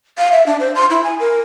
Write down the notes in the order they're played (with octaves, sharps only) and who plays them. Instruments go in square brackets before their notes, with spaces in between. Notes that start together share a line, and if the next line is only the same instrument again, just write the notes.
[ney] F5
E5
D4
C5
C6
E4
G#5
A#4